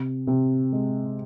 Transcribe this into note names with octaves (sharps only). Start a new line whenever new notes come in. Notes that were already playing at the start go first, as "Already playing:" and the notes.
Already playing: C3
C3
G#3